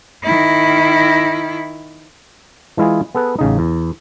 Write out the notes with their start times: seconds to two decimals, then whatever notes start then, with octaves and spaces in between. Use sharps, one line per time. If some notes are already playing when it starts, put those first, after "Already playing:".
0.24 D#3 E4
2.77 E3 G#3 E4 F4 G#4
3.15 B3 G#4 A4 B4
3.39 A1 C#3 D#4
3.59 E2